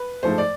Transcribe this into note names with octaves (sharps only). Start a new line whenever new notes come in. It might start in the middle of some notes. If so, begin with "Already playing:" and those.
Already playing: B4
G#2 F3 A3 C5
D5